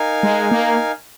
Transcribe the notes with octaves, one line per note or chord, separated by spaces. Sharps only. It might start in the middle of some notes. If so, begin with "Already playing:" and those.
Already playing: D#4 A#4 F5 G#5
G#3
A#3